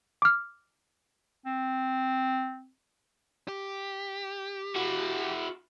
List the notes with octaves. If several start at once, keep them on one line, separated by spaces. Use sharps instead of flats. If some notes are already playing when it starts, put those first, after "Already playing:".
D6 F6
C4
G4
E4 F#4